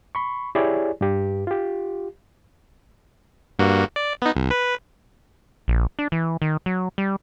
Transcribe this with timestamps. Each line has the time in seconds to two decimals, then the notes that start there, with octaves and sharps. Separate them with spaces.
0.15 B5 C#6
0.55 E4 G4 G#4 C#5 D5 G#5
1.01 G2 G4
1.47 F4 G4
3.59 G2 A#3 F#4
3.96 D5
4.22 B3 D#4
4.36 C2
4.51 B4
5.68 A#1
5.99 D4
6.12 E3
6.42 D#3
6.66 F#3
6.98 G3